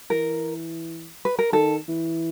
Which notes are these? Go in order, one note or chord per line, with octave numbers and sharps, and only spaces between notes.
E3 A#4
B4
A#4
D#3 A4
E3